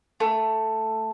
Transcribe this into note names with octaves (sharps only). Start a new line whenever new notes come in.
A3